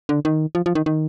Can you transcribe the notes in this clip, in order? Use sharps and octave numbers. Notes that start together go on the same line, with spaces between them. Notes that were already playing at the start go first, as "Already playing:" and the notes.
D3
D#3
F3
F3
D#3
D#3